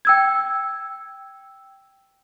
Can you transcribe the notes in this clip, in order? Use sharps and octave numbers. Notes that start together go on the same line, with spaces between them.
G5 E6 G#6